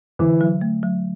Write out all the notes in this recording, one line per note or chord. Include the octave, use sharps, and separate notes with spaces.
D3 E3
F#3
A3
F#3